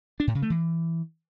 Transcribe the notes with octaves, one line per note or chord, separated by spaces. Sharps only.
D4
A2
C#3
A3
E3